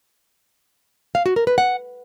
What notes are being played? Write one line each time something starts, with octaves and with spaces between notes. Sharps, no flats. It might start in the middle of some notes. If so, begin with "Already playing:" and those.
F5
F#4
A#4
B4
F#5